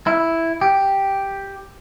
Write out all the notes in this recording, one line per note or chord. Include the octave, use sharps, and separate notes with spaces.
E4
G4